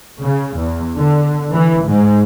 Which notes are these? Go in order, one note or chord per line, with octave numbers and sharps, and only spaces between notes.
C#3
E2
D3
E3
G#2